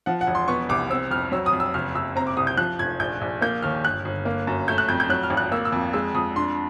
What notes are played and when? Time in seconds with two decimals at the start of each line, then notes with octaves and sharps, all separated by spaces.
0.06 F3 F#5
0.21 F#5
0.27 E1
0.35 C6
0.48 B3 C#6
0.69 C2 D6
0.90 C4 E6
1.11 F2 F6
1.32 F#3 E6
1.46 D#6
1.53 F2
1.60 E6
1.74 F#1 F6
1.95 F#1 E6
2.16 C4 A#5
2.27 D6
2.37 C2 D#6
2.47 G6
2.58 F3 F#6
2.79 F1 G#6
2.99 A#1 G6
3.21 A#1
3.41 A#3 G6
3.62 D#2 F6
3.85 G1 F#6
4.05 G1
4.25 A#3
4.47 F#2
4.68 A3 G6
4.78 F#6
4.89 F2 G6
5.00 G6
5.09 F#3 F#6
5.23 F6
5.30 G#1
5.37 F#6
5.52 A#3 E6
5.65 E6
5.72 F2
5.93 G#3 E6
6.15 F2 D#6
6.36 D4 C6